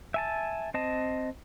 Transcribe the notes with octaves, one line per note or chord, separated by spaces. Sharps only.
E5 G#5 A5
C4 D#5 A5